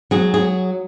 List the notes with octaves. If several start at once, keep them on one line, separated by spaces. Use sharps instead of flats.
F#3 G#4
G#4